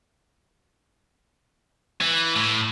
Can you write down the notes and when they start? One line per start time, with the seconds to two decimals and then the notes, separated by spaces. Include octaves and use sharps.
2.01 E3
2.36 A2